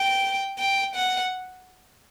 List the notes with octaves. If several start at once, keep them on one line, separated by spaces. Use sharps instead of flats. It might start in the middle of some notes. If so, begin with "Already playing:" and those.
Already playing: G5
G5
F#5